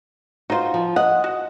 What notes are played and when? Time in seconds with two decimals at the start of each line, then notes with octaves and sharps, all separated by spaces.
0.50 D#4 F4 F#4 C5
0.74 F3
0.96 D#5 F#5
1.24 F#4